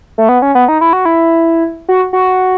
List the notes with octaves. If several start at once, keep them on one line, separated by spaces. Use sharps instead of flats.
A3
B3
C#4
B3
D#4
E4
F#4
E4
F#4
F#4